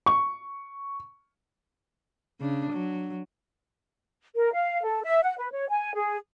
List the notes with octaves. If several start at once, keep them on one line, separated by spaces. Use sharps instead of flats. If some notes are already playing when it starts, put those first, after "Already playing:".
C#6
C#3 D4
F#3
A#4
F5
A4
E5
F#5
B4
C#5
G#5
G#4